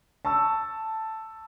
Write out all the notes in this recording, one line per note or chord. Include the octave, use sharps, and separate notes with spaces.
A5 C#6 E6